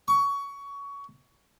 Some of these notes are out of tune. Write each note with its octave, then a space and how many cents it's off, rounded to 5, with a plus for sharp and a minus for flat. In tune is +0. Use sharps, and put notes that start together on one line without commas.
C#6 +20